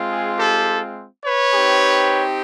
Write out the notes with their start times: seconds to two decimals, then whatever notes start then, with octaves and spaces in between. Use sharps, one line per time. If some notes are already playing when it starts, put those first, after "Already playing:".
Already playing: G#3 C4 F4
0.10 G#4
0.38 G4 A4
1.25 B4 C#5
1.54 C4 D#4 G4